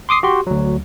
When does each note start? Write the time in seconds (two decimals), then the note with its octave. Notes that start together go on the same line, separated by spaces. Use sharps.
0.09 C6 D6 D#6 C7
0.23 F#4 G4 C6
0.47 D2 F#3